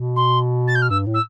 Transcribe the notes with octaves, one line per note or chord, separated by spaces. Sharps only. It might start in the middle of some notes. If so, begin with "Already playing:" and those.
Already playing: B2
C6
A6
G6
F6
G2 E6
A2
E6